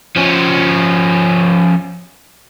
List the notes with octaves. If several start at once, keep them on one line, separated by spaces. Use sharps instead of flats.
F3 C#4